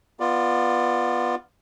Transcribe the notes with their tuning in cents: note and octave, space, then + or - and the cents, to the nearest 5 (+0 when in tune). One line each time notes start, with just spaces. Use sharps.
B3 -10 F4 +0 D5 +15